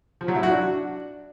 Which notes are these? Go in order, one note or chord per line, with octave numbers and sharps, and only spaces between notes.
F3
F#3
E4
F#4
D4